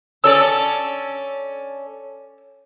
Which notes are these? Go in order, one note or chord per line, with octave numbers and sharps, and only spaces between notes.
C#4 A4 D5 E6